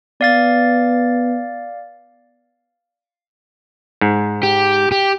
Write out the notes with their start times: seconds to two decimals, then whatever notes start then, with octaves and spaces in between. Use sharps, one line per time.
0.21 B3 D5 F5 A6
4.01 G#2
4.43 G4
4.92 G4